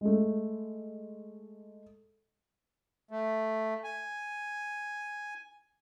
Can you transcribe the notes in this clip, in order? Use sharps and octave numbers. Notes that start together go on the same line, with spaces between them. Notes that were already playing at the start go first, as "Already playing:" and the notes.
G#3 A3
A3
G#5